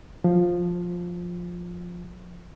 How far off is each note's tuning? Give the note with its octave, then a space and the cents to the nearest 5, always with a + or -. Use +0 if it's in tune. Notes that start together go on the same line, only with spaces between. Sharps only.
F3 +10